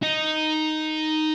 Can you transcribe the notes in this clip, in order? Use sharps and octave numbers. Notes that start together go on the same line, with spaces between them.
D#4